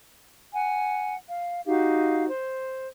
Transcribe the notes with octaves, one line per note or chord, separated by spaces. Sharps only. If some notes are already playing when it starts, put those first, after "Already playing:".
F#5 G#5
F5
D#4 F#4 G4 F5
C5